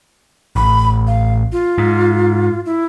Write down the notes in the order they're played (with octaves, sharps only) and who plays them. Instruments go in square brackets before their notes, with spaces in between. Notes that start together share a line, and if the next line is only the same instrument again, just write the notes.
[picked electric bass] A1 [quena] B5
[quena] F5
F4
[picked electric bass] G#2
[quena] E4